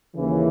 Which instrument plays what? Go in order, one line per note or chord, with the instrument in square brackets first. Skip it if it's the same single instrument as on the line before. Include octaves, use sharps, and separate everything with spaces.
[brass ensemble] D#2 C#3 E3